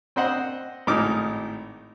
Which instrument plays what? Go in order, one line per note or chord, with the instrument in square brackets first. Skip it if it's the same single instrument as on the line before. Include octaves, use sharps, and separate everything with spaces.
[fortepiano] C4 D4 C5 D#5 F#5
G#1 A2 D#4 D6 F6